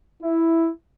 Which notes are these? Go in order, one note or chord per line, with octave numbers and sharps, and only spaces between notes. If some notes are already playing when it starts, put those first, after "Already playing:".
E4